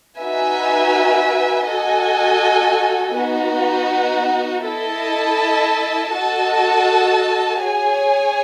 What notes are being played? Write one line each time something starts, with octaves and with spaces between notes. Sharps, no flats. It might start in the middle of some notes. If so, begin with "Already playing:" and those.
D#4 F#4 B4 E5 G#5
F#4 A4 D#5 G#5
B3 D#4 F#4
E4 A4 D#5 A5
F#4 A4 D#5 A5
G#4 C#5 G#5